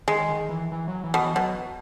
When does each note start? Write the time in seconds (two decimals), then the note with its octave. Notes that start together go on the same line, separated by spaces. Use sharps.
0.08 D#3 G#3
0.29 D#3
0.49 E3
0.72 E3
0.88 F#3
1.04 E3
1.14 B2
1.20 E3
1.35 B2 F#3